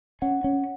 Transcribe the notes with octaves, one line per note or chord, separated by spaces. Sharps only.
C#4 F#5
C#4